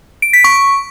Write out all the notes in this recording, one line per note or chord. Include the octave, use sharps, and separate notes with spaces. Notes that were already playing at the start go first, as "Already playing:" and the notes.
D7
B6
C#6